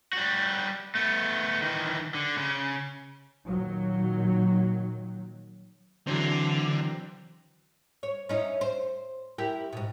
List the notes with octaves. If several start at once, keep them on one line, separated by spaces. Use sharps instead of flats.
G3 F#4
A3 B3
D#3 E3
D3
C#3
A#2 D#3 F#3
D3 E3 F#3 C4
C#5
C#4 D#4 E4
C5
E4 G4 A#4
G#2 B2